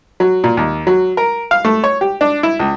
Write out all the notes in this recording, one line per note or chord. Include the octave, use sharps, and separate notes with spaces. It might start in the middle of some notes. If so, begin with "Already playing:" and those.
F#3
A#2
D#2
F#3
A#4
F5
A3
C#5
G4
D4
E4
C#2